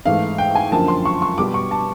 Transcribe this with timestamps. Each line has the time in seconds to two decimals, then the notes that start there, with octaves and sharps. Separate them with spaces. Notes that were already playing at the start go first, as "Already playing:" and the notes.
0.06 G#2 E3 A3 F5
0.38 G5
0.55 G#5
0.72 F#2 D3 F3 A#3 A5
0.88 C6
1.05 C#6
1.22 C#6
1.38 B2 G3 B3 D6
1.54 C#6
1.71 A5